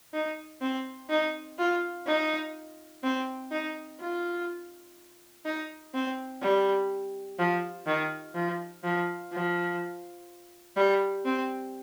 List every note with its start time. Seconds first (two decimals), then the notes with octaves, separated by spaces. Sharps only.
0.13 D#4
0.61 C4
1.09 D#4
1.58 F4
2.06 D#4
3.03 C4
3.51 D#4
3.99 F4
5.45 D#4
5.94 C4
6.41 G3
7.39 F3
7.86 D#3
8.35 F3
8.83 F3
9.32 F3
10.77 G3
11.25 C4